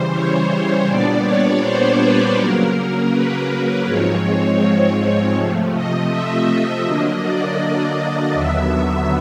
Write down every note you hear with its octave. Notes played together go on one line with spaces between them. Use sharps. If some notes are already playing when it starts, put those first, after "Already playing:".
Already playing: C#3 E3 G3 C5
C#5
C5
A#2 G3 B3 D4 D5
C#5
C5
B4
C#3 F#3 A#3 A#4
A#4
B4
G#2 F3 G#3 C4 C#5
C3 F3 A3
D#5
E5
D#5
D3 F#3 A#3 D4
D5
D#5
D#2 D3 F#3 B3 E5